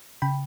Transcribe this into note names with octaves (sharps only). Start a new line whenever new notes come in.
C#3 G5 B5